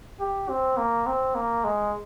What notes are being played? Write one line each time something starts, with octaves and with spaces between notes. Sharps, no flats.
G4
C4
A#3
C4
A#3
G#3